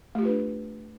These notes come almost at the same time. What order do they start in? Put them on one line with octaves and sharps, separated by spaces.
A3 G4 F4 B4 D4